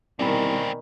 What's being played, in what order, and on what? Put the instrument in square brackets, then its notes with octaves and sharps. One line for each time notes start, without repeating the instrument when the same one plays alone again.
[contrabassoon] C2 [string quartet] B2 D#3 [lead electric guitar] A#3 C4 [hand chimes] D5 G#5 B5